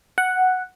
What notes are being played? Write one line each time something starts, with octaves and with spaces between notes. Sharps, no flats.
F#5